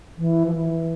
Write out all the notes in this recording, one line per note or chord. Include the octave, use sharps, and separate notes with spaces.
E3
F3
E3